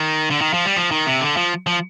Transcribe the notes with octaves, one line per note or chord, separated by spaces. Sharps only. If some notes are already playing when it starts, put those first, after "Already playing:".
Already playing: D#3
D3
D#3
F3
G3
F3
D#3
C3
D3
F3
F3